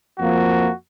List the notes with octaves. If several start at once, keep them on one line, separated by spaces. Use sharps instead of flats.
F2 F3 A#3 F#4